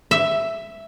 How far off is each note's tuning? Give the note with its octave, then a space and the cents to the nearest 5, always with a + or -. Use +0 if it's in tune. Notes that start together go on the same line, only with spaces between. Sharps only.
E5 +5